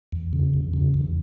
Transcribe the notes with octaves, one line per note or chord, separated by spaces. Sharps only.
E2
C#3
E2
C#3
E2